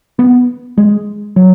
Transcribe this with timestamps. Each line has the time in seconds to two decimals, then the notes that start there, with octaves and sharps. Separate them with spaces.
0.19 B3
0.78 G#3
1.36 F#3